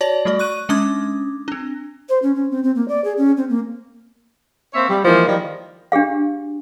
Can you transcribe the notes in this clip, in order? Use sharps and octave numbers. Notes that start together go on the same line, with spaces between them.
F#4 C#5 D5 A5 F#7
G3 A3 F#4 D5
C#6 F#6 D#7
G#3 C#4 D4 D6 D#6 G#6
C4 D4
C5
C#4
C#4
C4
C4
A#3
D5
G#4
C#4
C4
A#3
A#3 C4 C#5 E5
G3
E3 F3 G#3 A#3
D#3 F3 G3
D4 G4 G#4 F5